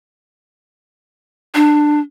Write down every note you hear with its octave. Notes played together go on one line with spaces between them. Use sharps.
D4